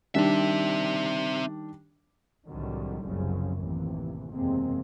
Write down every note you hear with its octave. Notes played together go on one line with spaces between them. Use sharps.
D#3 G3 C4 D4 E5
C2 A2 D3 D#3 F#3 G3
F#1 C2 F#2 C#3 F3
A1 D#2 C3 E3
F#1 E2 C3 G#3 A#3 C4